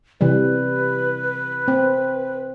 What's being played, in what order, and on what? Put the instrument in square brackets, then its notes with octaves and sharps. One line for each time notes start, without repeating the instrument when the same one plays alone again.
[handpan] C3 E3 G3 [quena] B4
[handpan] C4